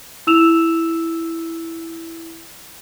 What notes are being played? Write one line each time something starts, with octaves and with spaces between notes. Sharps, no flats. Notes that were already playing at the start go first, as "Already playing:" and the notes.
E4 E6 E7 F7